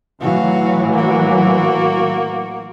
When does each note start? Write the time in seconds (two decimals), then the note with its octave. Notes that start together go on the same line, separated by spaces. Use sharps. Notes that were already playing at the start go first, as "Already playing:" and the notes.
0.21 A2 E3 F#3 F#4 F5
0.93 A#3 F#4